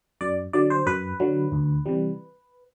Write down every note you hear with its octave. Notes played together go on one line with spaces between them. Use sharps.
F#2 D5
D3 F#3 D5
C5
F#2 B4
D3 F#3
D2
C3 E3 G3